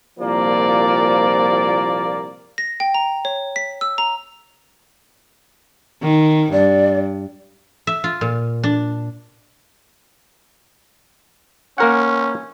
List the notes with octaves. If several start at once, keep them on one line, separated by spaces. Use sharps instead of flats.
C2 A#2 F3 A#3 D5
A#6
G5
A#5
C#5
B6
E6
A#5
D#3
G2 D5
E5
F4
A#2
D4
A#3 C#4 A#4 F#5